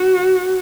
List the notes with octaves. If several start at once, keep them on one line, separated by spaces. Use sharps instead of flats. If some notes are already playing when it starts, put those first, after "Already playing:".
Already playing: F#4